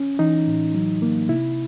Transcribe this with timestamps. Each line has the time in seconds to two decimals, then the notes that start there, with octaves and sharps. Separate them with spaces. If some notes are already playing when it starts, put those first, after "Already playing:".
Already playing: C#4
0.19 E3 D#4
0.47 A2
0.75 F#3
1.02 A#3
1.29 C3 E4